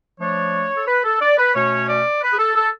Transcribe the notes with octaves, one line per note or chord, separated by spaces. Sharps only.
F3 A3 D4 C#5
A4
B4
A4
D5
B4
B2 A3 C#4 C#5
D5
B4
G#4
A4
A4